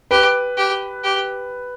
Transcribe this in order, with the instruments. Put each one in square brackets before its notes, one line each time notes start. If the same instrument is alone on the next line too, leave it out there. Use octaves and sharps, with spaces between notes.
[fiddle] G4 [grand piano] B4
[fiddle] G4
G4